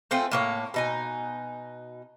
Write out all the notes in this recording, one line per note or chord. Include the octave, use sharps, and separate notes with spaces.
A3 C4 F4 G#4
A2 A#3 C#5
B2 D#4 G#5